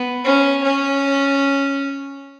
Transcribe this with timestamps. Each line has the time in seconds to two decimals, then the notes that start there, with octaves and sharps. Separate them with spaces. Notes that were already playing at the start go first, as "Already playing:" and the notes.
Already playing: B3
0.24 C#4
0.63 C#4